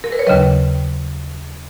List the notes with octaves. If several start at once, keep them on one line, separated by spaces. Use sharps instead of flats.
A#4
B4
C#5
D#2 C#3 F#3 B4 D#5